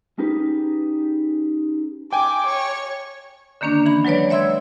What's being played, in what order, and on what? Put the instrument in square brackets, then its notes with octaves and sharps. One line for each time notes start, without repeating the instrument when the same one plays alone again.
[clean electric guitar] C#4 D#4 G4 G#4 B4
[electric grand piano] G5 G#5 [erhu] D6
[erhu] C#5
[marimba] D3 D#3 A#3 C#4 D4
E3 B5
F#3 G#3 B4 C#5 D5
C#5 E5 C6 E6 G#6